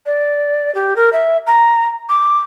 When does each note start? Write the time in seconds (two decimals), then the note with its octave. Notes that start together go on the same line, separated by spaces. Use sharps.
0.06 D5
0.74 G4
0.96 A#4
1.12 E5
1.46 A#5
2.09 D6